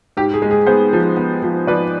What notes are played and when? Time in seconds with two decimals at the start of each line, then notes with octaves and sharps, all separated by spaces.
0.17 G#2 G4
0.34 G#4
0.42 G#3
0.51 G#4
0.66 B3 G#4 C5
0.93 F3
1.17 B3
1.42 F3
1.67 F3 B4 D5